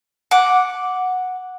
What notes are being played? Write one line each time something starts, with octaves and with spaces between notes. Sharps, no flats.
F#5 D6